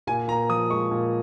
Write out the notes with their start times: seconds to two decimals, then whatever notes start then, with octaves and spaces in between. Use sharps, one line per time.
0.07 A#2 G#5
0.28 A#2 A#5
0.49 F3 D#6
0.70 G#3 C#6
0.91 A#2